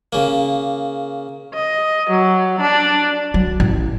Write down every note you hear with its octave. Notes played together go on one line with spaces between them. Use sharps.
C#3 A#3
D#5
F#3
D4
F#3
A1